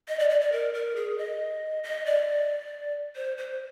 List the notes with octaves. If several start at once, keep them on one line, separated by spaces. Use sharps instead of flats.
D#5
D5
D5
D5
A#4
A#4
G#4
D#5
D#5
D5
C5
C5